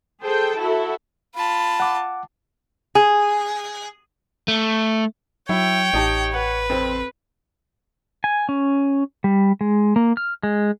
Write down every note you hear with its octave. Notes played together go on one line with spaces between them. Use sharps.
G#4 A4 C5 G5 A5
E4 F#4 A4 E5
F4 A5 B5
F#5 D6
G#4
A3
F#3 E4 C#5 G5
A1 D#4 G4 A5
B4 F#5
F2 C4
G#5
C#4
G3
G#3
A#3
F6
G#3